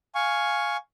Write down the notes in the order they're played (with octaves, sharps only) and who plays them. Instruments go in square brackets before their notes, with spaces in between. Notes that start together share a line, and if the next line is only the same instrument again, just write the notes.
[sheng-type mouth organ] F5 G#5 C#6